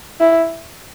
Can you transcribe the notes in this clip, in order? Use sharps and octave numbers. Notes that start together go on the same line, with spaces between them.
E4